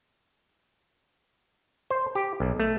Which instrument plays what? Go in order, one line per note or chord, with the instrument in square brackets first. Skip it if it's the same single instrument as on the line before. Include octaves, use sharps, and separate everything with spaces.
[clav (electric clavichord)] C5
G4
B1
A3